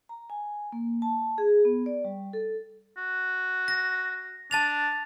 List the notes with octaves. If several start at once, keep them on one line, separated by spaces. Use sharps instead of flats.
A#5
G#5
A#3
A5
G#4
B3
D5
G3
A4
F#4
A#6
D4 A5 A6 F7